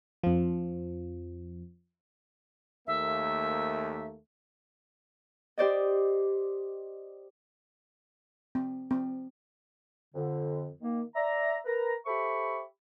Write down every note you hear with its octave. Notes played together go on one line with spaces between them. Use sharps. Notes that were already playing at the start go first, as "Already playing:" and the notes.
F2 F3
D#2 A3 A#3 E5
G4 C5 D5 D#5
C4
C4
F2 D3
D#3 A#3
D5 E5 A#5
A#4 B4 A#5
G4 A4 C5 E5 B5 C#6